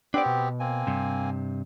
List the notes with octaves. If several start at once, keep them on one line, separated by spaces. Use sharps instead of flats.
B3 C4 D4 G4 D5
B2
A#3 C4 G#5
G2 C3